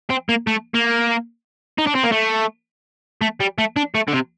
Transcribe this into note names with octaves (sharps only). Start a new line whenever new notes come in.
C4
A#3
A3
A#3
D#4
D4
C4
A#3
A3
A3
G3
A3
D4
A3
D3
C3